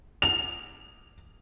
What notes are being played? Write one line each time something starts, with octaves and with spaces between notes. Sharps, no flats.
F7